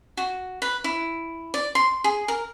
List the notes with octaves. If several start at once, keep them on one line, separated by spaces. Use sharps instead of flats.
F#4
B4
E4
D5
C6
G#4
A#4